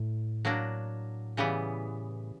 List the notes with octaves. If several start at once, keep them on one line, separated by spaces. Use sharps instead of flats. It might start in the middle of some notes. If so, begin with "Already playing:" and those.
Already playing: A2
F#3 A#3 D4
C#3 E3 G3 B3